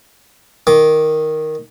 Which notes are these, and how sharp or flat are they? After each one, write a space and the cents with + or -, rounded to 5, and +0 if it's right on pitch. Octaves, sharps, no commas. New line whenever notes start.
D#3 +0 D6 -10